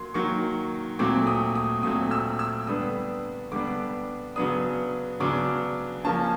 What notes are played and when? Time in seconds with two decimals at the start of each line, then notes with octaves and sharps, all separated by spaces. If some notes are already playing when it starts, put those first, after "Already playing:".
Already playing: F#3 A#3 C6
0.14 D#3 F#3 A#3 C#6
0.99 A#2 F#3 A3 C4 D6
1.27 D#6
1.55 D#6
1.83 A#2 F#3 A3 C4 D#6
2.11 E6
2.39 E6
2.67 D3 G3 B3 D4 D#6
3.52 D3 G3 B3 D4 D6
4.36 C#3 F#3 B3 D4 D#6
5.20 C#3 F#3 B3 D4 D6
6.04 F3 A#3 C#4 A5